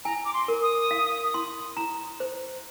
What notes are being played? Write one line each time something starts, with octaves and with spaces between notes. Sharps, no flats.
G#5 A#5
D6
C6
A#4
D#6
F5
C6
A#5
C5